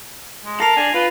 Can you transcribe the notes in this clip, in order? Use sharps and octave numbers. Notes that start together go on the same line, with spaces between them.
G#3
A4 A#4 A#6 C7 F7
D4 G#5
F4 B4